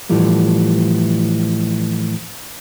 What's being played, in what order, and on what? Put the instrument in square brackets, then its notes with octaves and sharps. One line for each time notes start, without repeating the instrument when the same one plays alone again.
[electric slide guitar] A2 E3 F3 G3 A3